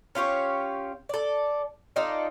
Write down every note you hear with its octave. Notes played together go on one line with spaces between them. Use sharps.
C#4 F4 G4 C#5
A4 D5
D#4 F4 A4 D5